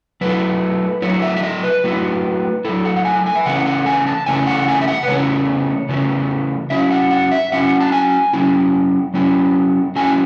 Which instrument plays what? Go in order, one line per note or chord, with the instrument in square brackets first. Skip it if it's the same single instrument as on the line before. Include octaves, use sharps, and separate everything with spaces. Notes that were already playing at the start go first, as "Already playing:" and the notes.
[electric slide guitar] F#3 A3 E4 B4
F#3 A3 E4 C#5
E5
E5
D#5
B4
F#3 A3 E4
F#3 A3 E4 A4
F#5
F#5
G#5
G#5
E5
C#3 E3 A3 C#4 E4 F#5
F#5
G#5
A5
C#3 E3 A3 C#4 E4 G#5
F#5
G#5
E5
F#5
B4
C#3 E3 A3 C#4 E4 C#5
C#3 E3 A3 C#4 E4
F#3 C#4 E4 E5
F#5
F#5
E5
F#3 C#4 E4 F#5
A5
G#5
F#3 C#4 E4
F#3 C#4 E4
F#3 A3 C#4 E4 G#5